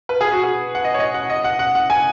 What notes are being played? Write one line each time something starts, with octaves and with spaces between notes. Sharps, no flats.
B4
G#4
F#4
G#4
F#5
D#5
C#5
D#5
F#5
D#5
F#5
F#5
F#5
G#5